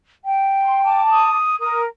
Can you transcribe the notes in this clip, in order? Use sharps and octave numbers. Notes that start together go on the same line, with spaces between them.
G5
C6
A5 D6
D#6
A#4 D#6